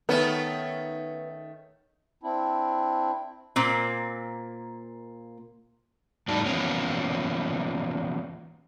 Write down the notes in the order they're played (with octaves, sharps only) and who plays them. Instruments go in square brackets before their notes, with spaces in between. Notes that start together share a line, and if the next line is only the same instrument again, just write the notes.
[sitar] D#3 A3 C#4 [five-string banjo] B3
[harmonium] C4 D4 E4
[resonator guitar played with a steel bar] A#2 A#3 C4
[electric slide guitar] F2 A2 G3 D#4 D5 A5
E3 F3 A#3 B3 C#4